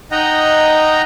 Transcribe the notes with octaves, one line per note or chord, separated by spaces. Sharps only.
D#4 D#5 F#5 G5 A#5